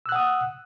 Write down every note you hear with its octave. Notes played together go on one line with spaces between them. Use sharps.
F#5 D#6 E6 F#6